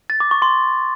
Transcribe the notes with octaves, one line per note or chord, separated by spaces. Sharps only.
A6
D6
C#6
C6